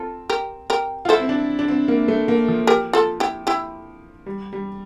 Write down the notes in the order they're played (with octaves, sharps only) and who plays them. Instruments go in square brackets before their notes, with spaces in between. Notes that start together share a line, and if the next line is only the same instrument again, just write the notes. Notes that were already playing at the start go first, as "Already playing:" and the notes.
Already playing: [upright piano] C4 [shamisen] F4 A4
[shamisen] G4 A#4
G4 A#4
[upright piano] F4
[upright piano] E4 [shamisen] A4 C5
[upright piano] C4
D4
D4
C4
A#3
A3
A#3
F3
[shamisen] G4 A#4
F4 A4
E4 G4
E4 G4
[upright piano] G3
G3